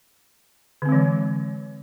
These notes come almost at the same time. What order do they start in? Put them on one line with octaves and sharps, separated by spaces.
D3 C4 G#3 E3